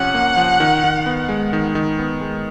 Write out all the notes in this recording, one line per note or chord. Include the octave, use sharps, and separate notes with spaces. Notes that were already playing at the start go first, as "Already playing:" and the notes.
Already playing: C3 F3 C#4 F#5
A#3
F3
D#3
D#3
B3
G#3
D#3
D#3
B3
G#3